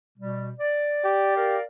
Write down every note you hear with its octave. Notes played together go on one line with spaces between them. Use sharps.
B2 G3
D5
G4
A#4 D5 F5